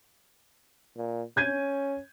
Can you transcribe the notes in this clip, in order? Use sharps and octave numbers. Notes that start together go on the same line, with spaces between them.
A#2
C#4 G6 G#6 D#7